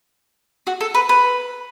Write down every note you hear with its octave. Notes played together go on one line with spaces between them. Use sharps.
F#4
A4
B4
B4